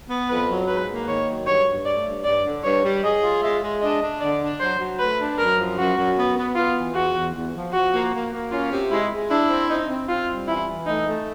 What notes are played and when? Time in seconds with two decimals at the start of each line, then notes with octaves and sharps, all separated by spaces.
0.09 B3
0.29 F2 B4
0.48 F#3
0.68 G#2 B4
0.88 A#3
1.07 D#3 C#5
1.27 F#3
1.46 G2 C#5
1.66 G2
1.86 A3 D5
2.06 G2
2.24 G2 D5
2.44 D3
2.64 G2 C#5
2.84 G3
3.03 G#4 D#5
3.23 F4
3.42 G#3 E5
3.61 G#3
3.82 D4 D#5
4.01 D4
4.20 D3 D5
4.41 D4
4.60 F#3 C5
4.80 F#3
4.99 A3 B4
5.18 D4
5.38 F#2 A#4
5.58 F3
5.78 F#2 F#4
5.96 F#2
6.17 B3
6.37 B3
6.55 B3 F4
6.75 E3
6.95 E2 F#4
7.15 E2
7.34 E2
7.54 F3
7.73 F3 F#4
7.93 A#3
8.13 A#3
8.32 A#3
8.52 C#4 F4
8.71 C3
8.91 G#3 E4
9.11 G#3
9.30 D4 E4
9.49 C4
9.69 C4 D#4
9.88 C4
10.09 C4 F4
10.28 G3
10.48 E3 E4
10.67 E3
10.87 A3 D#4
11.06 A3